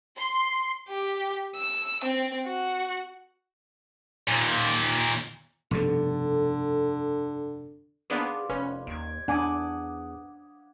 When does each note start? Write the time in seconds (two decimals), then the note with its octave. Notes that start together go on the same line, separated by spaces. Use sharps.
0.17 C6
0.89 G4
1.56 E6
2.04 C4
2.47 F#4
4.28 D#2 A#2
5.71 F1 G2 B2 D3 A4
8.10 A#3 B3 D4 G#4 C5 D5 F5
8.50 F1 C#4 B4
8.87 D#2 G#6 D7
9.28 E2 D4 F#5 G#5 D6 D#6